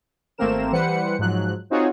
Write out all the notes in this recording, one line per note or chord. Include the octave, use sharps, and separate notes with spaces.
G#1 A3 A#3 C4 A#4 E7
E3 G3 B4 C5 F#5 C#7
G#2 F3 F#3 F#6
C4 D#4 F4 F#4 G#4 C#5